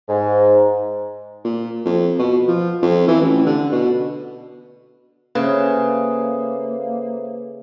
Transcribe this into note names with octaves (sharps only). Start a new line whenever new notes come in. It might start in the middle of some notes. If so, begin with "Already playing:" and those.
G#2
A#2
F2
B2
F3
F2
E3
A1
D3
B2
C#3 A#3 A4 B4 C5 E5